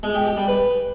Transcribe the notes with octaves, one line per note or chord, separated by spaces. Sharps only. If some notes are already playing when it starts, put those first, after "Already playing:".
G#3
G4
G4
G3
B4